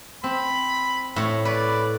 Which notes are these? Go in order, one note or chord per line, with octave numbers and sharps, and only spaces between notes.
C4 B5
A2 C#5
B4 D5